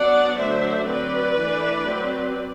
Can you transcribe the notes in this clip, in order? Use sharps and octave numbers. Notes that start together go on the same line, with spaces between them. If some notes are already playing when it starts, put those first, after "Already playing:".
Already playing: F#3 B3 D4 D5 F#5
D3 F#3 A3 D4 C5 E5
F#3 C4 B4 D5
E3 A3 D4
F#3 C4